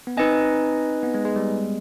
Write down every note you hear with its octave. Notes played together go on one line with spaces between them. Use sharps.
B3
C4 D#4 B4 D#5 G#5
B3
G#3
G#3
G3